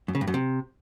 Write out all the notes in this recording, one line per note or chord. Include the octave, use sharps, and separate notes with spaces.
F#2
C#3
G2
F#2
C3